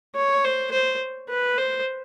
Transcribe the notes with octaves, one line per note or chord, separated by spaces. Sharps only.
C#5
C5
C5
B4
C5